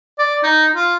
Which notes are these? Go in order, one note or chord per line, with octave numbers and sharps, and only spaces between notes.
D5
D#4
F4